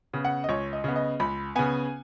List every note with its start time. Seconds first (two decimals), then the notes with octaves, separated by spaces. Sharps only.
0.13 C#3 B3
0.25 F#5
0.44 D#5
0.49 C#2 C#5
0.73 D#5
0.84 C#3 B3
0.96 D#5
1.20 C#2 B5
1.56 C#3 B3 G#5